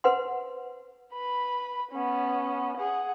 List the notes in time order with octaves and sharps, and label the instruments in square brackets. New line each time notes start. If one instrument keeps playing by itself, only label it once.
[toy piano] B4 C5 F#5 C6
[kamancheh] B4 B5
B3 C#4
G#4 F#5